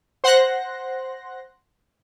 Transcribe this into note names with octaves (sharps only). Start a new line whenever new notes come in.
C5 F#5 C6 F#6 A#6